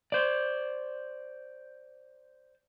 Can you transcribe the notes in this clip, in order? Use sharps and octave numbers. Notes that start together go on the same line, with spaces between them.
C5 D5